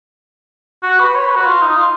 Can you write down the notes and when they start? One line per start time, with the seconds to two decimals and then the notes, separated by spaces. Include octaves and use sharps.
0.83 F#4
1.00 B4
1.15 C#5
1.25 B4
1.36 F#4
1.46 F4
1.62 D#4
1.77 F4